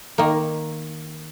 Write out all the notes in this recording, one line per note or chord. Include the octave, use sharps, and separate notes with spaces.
D#3 A#3